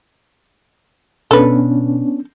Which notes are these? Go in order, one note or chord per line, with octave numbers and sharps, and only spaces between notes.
B2 B3 C#4 D4 A4 B4